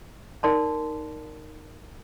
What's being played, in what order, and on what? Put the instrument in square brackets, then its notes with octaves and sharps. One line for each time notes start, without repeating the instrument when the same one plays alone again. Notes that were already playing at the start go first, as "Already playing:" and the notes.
[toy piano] D#4 A#4 D5 A5 C6